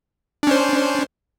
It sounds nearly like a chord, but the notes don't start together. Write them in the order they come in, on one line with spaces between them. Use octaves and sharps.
D4 C#4 C5